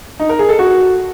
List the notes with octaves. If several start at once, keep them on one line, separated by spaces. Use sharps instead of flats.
D#4
A#4
G#4
A4
F#4